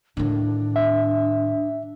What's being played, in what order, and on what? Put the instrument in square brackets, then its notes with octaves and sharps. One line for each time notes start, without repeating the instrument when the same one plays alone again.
[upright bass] A2 D#3 [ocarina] D4
[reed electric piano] E5